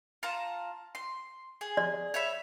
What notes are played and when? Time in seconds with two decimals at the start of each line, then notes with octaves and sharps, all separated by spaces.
0.23 F4 A5 A#5
0.95 C6
1.61 G#4
1.77 D5
2.14 C#5 E5 B5